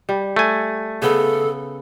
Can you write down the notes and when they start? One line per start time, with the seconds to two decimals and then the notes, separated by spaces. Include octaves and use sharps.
0.09 G3
0.36 A3 G#5
1.02 C#3 B3 A4